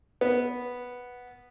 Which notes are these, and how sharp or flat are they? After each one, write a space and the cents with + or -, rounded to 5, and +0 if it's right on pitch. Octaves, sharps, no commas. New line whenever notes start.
B3 -5